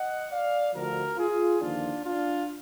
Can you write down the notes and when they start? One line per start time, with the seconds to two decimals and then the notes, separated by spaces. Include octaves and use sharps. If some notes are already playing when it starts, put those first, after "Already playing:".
Already playing: D#5 F#5
0.31 D5 F5
0.73 D2 D3 F3 F#4 A#4
1.17 F4 G#4
1.60 D#2 D3 F3 D4 F4
2.05 D4 F4